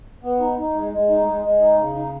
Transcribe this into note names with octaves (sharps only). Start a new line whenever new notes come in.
B3
D#4
D#4
G#3
G#3
D#4
G#3
G#3
D#4
C#3
D#4